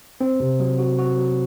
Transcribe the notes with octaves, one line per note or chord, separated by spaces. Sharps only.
C4
C3
F#3
F#4
F#4
F#3